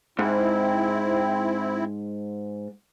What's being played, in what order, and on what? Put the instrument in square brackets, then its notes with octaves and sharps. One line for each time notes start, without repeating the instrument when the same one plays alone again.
[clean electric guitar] G#2 [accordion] C4 E4